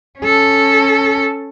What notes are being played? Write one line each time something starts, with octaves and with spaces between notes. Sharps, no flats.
C#4 A4